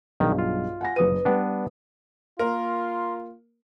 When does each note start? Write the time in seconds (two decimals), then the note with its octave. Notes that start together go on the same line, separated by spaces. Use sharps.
0.20 B1 G2 D#3 G#4 D5 F5
0.39 F4
0.81 F#5 G#5 A#6
0.96 F#1 B4 D#6 D#7
1.25 G3 B3 D4 G5
2.39 A#3 F4 A#4 C6